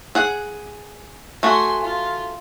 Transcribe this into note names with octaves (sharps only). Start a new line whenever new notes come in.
G#4 F#5
A3 F#4 G#5 C6
F4